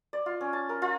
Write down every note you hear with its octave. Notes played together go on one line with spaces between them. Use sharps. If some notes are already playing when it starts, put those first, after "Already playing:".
D5
F4
C#4
A5
A#4
F4